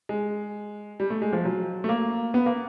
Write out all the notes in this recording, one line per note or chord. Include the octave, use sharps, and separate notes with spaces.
G#3
G3
A3
G#3
F3
F#3
A3
A#3
B3
A#3